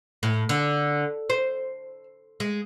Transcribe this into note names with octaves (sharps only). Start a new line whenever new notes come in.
A2
D3
C5
G#3